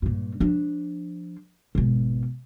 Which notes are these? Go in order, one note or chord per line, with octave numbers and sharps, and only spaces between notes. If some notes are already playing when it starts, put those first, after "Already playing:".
G2 A#2
F3 D4
G#1 B2